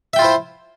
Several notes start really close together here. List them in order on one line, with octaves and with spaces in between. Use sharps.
E5 G5 F4 E4 C5